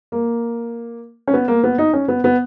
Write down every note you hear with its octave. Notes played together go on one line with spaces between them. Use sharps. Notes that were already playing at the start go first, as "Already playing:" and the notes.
A#3
C#4
B3
A#3
B3
D#4
C#4
B3
B3